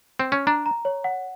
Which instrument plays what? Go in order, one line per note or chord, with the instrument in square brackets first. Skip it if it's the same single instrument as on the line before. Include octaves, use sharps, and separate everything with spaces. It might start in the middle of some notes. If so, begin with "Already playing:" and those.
[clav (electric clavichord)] C4
C#4
[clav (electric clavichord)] D4 [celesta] A#5
[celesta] A#5
C#5
F#5